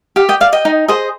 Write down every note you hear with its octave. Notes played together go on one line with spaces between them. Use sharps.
G4 F5
D#5 G5
D5 F5
D#5 G5
D#4
G#4 C5 D#5